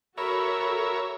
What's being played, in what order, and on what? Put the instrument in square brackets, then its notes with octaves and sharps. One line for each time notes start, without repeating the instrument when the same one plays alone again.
[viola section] F#4 A4 [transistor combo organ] A#4 C#5 E5 [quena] B5